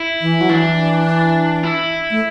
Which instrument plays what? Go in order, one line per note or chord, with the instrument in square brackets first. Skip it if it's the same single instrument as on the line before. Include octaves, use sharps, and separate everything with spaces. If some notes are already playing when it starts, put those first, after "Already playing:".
Already playing: [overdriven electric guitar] E4
[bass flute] E3
F#3
[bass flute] E3 [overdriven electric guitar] D4
[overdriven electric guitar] E4
[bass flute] A3